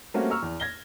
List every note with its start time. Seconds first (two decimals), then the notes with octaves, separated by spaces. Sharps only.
0.14 G3 A3 A#3 C4 C#4 F#4
0.30 A#5 C#6 E6 F6
0.42 E2
0.60 G#6 A#6 G7